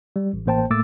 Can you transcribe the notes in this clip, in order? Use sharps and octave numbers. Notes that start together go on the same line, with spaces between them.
G3
A1
A1 A#3 C5 G5 A5
A2 A3 A#3 D6 E6 A6